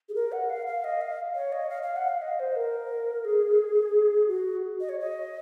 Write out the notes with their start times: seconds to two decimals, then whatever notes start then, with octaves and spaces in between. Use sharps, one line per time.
0.09 G#4
0.15 A#4
0.32 F#5
0.50 F5
0.67 F5
0.84 D#5
1.01 F5
1.35 C#5
1.52 D#5
1.70 F5
1.83 F5
1.96 F#5
2.09 F5
2.22 D#5
2.40 C5
2.56 A#4
3.25 G#4
4.28 F#4
4.80 D#5
4.89 C#5
5.00 D#5